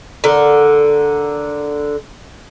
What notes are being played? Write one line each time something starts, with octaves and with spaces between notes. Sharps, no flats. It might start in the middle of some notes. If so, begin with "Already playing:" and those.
D3 A#4